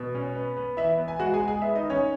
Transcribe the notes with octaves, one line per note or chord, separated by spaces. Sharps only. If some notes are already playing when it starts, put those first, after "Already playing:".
Already playing: B2
C#4
B3
B3
E3 E4 E5
B3
G#5
G#3 F#4 F#5
G#4 G#5
G#3
G#4 G#5
B3 E4 E5
D#4 D#5
D#3
C#4 C#5